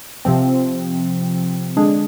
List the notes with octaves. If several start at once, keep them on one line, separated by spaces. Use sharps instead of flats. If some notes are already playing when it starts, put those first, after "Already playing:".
C3 F3 C4
D3 G#3 D4 G#4